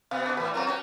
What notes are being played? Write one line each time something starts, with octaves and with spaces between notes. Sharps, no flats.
B2 B3 F5
D4 F#4
A2 E3 B4
F#3 C4 F4 A#4 F5 A#5
F#3 C#4 G4 A#5